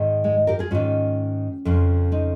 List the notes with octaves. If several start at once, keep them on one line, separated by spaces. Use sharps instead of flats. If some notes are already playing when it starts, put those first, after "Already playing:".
Already playing: G#2 D#3
G#3
G4 A#4
F4 G#4
G#2 D#3 C#4 F4
F2 C#3 F3
C4 D#4